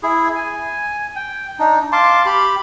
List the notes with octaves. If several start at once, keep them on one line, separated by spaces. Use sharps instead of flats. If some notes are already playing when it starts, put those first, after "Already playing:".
E4 G#4
G#5
G5
D4 D#4
F5 A5 C6 D6
G4 B5